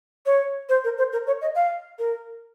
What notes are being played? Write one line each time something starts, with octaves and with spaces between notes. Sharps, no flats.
C#5
C5
A#4
C5
A#4
C#5
D#5
F5
A#4